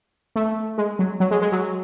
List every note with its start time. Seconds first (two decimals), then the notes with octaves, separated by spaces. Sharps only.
0.36 A3
0.78 G#3
0.99 F#3
1.20 F#3
1.31 G#3
1.42 G#3
1.52 F#3